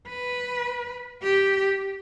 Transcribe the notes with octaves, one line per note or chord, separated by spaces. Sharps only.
B4
G4